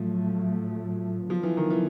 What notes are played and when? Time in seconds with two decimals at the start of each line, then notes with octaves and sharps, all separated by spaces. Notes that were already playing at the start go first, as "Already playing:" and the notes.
Already playing: A2 F3 F#3 A3
1.30 D3 F3 F#3 B3
1.43 E3
1.57 D#3
1.70 E3